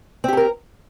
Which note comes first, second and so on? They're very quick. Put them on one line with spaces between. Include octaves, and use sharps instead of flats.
C4 G4 A4 A#4